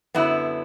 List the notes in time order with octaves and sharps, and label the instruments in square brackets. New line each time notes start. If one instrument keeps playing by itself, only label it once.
[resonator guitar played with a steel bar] F#2 D3 F#3 B3 E4